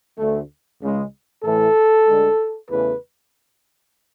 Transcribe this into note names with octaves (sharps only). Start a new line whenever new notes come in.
D2 D3 A3
C#2 C#3 G#3
A2 E3 A3 A4
D2 D3 G#3
E2 C#3 E3 A3 B4